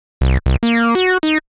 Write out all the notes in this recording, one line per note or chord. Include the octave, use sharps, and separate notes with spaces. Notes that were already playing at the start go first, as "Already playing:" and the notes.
C2
C2
A#3
F#4
D#4